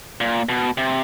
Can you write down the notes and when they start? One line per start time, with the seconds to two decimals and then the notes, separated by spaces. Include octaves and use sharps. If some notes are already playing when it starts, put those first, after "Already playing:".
0.21 A#2
0.49 B2
0.78 C3